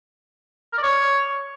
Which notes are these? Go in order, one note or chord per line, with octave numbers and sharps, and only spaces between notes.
A#4
D5
C#5